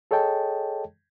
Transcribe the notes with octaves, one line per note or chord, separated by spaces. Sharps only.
G#4 A4 C#5 D#5 G5 A5